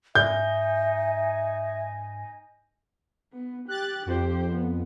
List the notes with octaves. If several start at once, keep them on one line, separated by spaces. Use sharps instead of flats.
G#2 D#4 D#5 E5 G#5 G6
B3
G4 F#6 A6
F2 G4 C5
B3